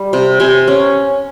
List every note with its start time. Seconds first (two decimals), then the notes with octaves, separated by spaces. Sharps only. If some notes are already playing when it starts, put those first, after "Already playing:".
Already playing: G3
0.13 C3
0.40 C3 G#5 C6
0.68 C#4